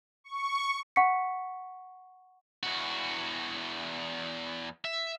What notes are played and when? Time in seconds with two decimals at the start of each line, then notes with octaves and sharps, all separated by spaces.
0.24 C#6
0.96 F#5 C#6 B6 C#7
2.63 E2 F#4
4.85 E5